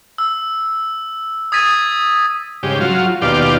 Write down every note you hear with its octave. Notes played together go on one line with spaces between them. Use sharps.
E6
D#6 G#6 A6 B6 D#7
G#2 C#3 G4
F#3 F4
D#2 B2 F4 G4 D5